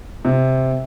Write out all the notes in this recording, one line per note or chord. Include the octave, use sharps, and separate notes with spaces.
C3